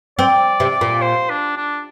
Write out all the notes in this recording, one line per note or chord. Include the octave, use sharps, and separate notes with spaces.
C4 D5
C3
A#2
C5
D4
D4